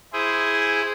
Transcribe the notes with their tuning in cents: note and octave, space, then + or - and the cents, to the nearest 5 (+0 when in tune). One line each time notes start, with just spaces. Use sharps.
E4 +0 G#4 +0 C5 -10